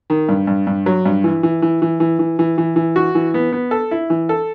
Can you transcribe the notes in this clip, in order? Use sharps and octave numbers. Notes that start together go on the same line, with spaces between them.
D#3
G2
G2
G2
F#3
G2
E3
E3
E3
E3
E3
E3
E3
E3
E3
F#4
E3
B3
B3
A4
E4
E3
A4